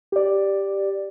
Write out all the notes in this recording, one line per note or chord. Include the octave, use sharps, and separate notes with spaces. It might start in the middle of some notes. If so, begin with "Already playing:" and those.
G4 D5